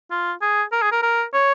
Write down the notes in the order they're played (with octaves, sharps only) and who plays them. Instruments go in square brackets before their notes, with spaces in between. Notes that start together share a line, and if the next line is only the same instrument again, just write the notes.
[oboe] F4
G#4
A#4
G#4
A#4
A#4
C#5